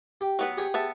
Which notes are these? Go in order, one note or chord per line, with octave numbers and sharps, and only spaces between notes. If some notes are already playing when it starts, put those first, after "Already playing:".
G4
F#3 B3 B4
G4 G#4 C#5
B3 E5 A5